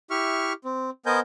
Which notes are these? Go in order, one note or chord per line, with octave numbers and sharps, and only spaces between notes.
E4 G4 E5 C#6 F6
C4
B3 A#4 C5 D#5 G#5 G6